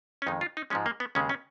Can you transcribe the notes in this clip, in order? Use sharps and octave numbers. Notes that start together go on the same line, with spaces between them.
C#4
F2 D#3 G#3 D#4
F4
D#4
G#2 F3 G#3 C#4
A#3
B3
D#2 C#3 G#3 C#4
C#4